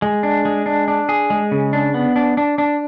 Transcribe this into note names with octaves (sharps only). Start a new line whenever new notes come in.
G#3
D4
G#3
D4
D4
G#4
G#3
C#3
D4
B3
D4
D4
D4